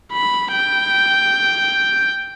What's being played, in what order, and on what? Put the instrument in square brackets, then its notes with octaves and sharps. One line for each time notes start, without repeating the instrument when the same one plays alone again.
[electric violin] B5
G5